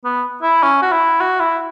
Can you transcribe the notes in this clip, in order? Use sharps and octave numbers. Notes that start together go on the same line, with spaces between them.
B3
E4
C#4
F#4
E4
F#4
E4